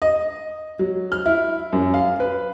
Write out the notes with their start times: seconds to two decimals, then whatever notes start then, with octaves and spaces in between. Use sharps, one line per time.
0.02 D#5
0.79 F#3
1.12 F6
1.26 E4
1.73 F#2
1.94 F5
2.20 B4